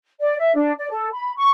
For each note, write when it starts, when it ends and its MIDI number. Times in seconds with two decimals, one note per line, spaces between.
0.20 0.37 74
0.39 0.53 76
0.55 0.72 62
0.78 0.90 74
0.91 1.08 69
1.13 1.32 83
1.37 1.50 85